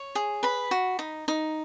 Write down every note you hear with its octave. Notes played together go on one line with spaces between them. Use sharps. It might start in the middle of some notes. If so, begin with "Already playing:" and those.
Already playing: C#5
G#4
B4 B5
F#4
D#4
D#4